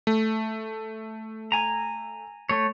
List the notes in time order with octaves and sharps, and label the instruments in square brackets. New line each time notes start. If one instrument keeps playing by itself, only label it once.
[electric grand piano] A3
[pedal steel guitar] G#5 A#5
A3 C#5